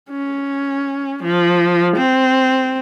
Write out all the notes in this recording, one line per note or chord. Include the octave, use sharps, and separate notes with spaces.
C#4
F3
C4